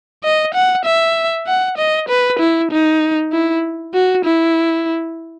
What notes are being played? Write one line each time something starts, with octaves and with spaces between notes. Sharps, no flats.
D#5
F#5
E5
F#5
D#5
B4
E4
D#4
E4
F#4
E4